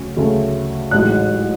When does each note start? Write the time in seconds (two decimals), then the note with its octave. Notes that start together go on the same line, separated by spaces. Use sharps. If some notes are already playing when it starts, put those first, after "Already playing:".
Already playing: D2 C#3 F#3 C#4
0.17 D2 C#3 F#3 A3 C#4
0.91 A1 G#2 F#3 F#6